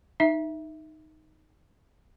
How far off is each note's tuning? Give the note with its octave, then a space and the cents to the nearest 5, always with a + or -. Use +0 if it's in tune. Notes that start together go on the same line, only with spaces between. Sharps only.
D#4 +0 E5 +0